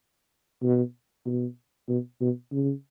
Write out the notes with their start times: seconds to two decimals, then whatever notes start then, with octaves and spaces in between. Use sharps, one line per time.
0.63 B2
1.26 B2
1.89 B2
2.21 B2
2.52 C#3